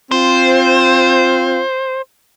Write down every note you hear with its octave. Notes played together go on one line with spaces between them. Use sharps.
C4 F4 C5